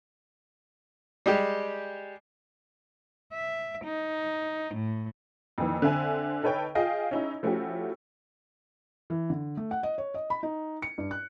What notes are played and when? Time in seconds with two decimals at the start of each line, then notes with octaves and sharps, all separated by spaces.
1.26 G3 G#3 G4
3.33 E5
3.85 D#4
4.74 A2
5.58 F2 A#2 D#3 E3
5.82 D3 C4 E5 G#5
6.43 D#4 A4 B4 C#5 G5
6.75 F4 G#4 D#5 F5 G5
7.11 C#4 D#4 E4
7.43 F3 A3 C#4 E4 F#4 G4
9.10 E3
9.30 D3
9.57 A3
9.71 F#5
9.83 D#5
9.98 C#5
10.14 D#5
10.30 B5
10.43 D#4
10.82 C#7
10.98 G2
11.11 F#6